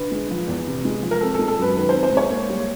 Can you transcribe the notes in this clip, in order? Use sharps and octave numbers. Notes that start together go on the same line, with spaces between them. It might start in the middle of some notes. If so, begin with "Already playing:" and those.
Already playing: D3 B4
G#3
F3
E2
C3
G#3
F3
A#4
C4 A4
A4
G#3
A4
F#2 B4
D#3 B4
C4 C5
C5
G#3
C#5
A#3
G3